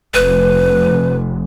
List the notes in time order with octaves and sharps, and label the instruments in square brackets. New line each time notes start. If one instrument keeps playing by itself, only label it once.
[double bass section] F1 [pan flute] B4